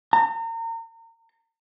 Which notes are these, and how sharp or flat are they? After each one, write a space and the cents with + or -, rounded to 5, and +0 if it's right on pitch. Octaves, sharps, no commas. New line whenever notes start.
A#5 -35